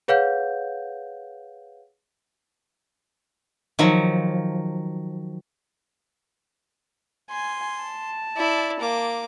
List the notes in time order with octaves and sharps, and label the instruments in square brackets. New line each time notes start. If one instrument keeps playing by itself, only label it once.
[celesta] G#4 B4 C#5 F5 F#5 G6
[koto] D#3 F3 F#3
[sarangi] G#5 [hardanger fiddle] C6
[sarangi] A5
[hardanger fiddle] E4 D5
A#3 D6